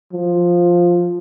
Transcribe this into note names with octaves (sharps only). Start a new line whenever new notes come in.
F3